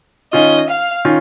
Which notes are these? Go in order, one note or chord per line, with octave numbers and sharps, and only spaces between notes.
D#3 C#4 F4 D#5
F5
D#3 C#4 F4